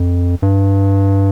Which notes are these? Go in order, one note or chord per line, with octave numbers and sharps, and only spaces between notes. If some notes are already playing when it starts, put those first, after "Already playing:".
Already playing: F2
G2